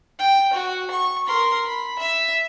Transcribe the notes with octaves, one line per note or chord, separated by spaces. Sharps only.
G5
F#4
C#6
A#4 C6
B5
E5